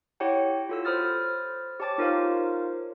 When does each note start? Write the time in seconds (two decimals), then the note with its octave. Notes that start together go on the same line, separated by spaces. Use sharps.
0.20 E4 G4 C#5 F#5 G5
0.69 F4 F#4 A4 C#5 E6
0.85 C5 B5 D#6 F6 A6
1.80 G4 C#5 A5 D6 A6
1.98 D#4 F4 A#4 C5 C#5 F5